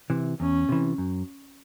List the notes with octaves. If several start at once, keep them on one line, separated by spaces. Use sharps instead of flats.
C3 E3
E2 C#4
C3 E3
F#2